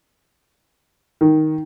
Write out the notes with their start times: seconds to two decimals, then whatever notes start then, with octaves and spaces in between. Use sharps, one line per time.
1.21 D#3